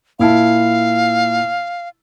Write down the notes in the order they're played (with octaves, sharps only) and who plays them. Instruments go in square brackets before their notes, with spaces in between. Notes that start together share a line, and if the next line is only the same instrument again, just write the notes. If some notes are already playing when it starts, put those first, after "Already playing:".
[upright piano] A#2 E4 A5 [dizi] F5